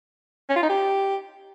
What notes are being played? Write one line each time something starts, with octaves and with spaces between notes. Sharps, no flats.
C#4
F4
D#4
G4